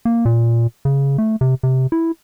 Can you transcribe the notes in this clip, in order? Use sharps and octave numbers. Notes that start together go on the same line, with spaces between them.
A#3
A#2
C#3
A3
C3
C3
E4